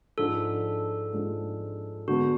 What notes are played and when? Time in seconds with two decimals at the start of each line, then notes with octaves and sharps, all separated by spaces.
0.18 G#2 F3 G#3 D4 A4
1.13 G#2 F3 G#3 D4
2.08 D3 G#3 B3 F#4